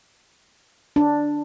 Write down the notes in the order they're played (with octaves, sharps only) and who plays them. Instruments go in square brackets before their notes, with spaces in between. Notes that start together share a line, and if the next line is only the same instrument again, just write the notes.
[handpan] D4